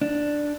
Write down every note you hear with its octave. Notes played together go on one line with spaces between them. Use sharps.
D4